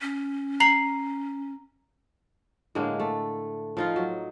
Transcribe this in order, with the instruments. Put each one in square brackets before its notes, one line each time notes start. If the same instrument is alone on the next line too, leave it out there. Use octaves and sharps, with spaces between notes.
[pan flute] C#4
[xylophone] A#5 C7 F#7
[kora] A2 D3 G#3 A#3
A3
F3 D#4 F4
F#3